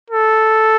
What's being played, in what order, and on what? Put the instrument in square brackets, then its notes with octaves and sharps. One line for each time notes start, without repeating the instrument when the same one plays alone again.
[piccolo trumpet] A4